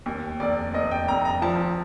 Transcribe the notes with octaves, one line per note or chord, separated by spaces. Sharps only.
D#2
F1 D5
F1 D#5
G5
F1 A#5
A#5
F3 A5